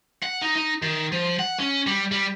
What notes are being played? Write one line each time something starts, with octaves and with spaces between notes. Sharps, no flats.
F#5
D#4
D#4
D#3
F3
F#5
C#4
G3
G3